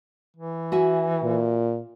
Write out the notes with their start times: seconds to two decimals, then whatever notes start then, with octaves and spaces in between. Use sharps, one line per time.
0.37 E3
0.72 F#4 E5 G#5
1.23 A#2